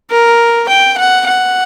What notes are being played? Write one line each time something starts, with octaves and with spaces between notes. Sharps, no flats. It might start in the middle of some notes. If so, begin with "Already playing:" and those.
A#4
G5
F#5
F#5